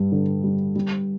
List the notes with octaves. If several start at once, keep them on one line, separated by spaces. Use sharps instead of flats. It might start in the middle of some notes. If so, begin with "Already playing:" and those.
Already playing: G2 G3
D3
G3
G3